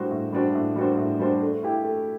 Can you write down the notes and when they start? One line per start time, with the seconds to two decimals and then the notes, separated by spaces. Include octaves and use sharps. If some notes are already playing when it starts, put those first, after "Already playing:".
Already playing: A2 G3 D4 F#4 C5
0.11 A2
0.33 G3 D4 F#4 C5
0.55 A2
0.76 G3 D4 F#4 C5
0.98 A2
1.19 G3 D4 F#4 C5
1.42 A3
1.63 E4 G4
1.84 A3